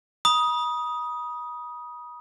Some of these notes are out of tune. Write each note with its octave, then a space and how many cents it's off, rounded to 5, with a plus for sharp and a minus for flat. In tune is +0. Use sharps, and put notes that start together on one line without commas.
B5 -40 D#6 +5